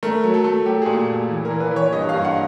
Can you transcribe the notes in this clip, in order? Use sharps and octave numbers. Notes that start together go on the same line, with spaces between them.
A3 A#4
F#3
A4
A3
F#3 G4
A#2 G#4
A#2
E3
A#4
E3
B4
E3
C#5
G2 D#5
G2 F5
F#5